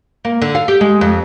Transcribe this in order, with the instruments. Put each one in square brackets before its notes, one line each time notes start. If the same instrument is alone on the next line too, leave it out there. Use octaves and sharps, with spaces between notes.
[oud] A#3
D3
F5
G4
G#3
F2